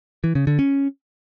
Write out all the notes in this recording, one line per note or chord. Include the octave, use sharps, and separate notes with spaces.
E3
C#3
D3
C#4